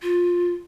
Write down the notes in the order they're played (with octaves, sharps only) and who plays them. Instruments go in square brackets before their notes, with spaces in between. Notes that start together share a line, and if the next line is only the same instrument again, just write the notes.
[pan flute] F4